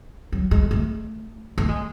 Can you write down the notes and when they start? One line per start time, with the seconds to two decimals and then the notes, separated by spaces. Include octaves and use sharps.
0.32 F#3
0.51 G#3
0.71 A3
1.58 A3
1.69 G#3